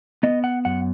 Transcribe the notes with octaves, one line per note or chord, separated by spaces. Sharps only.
B3 D#5
F#5
F#2 F#5